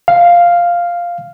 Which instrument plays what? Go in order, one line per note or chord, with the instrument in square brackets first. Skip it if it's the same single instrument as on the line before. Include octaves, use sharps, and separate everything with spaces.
[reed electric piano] F5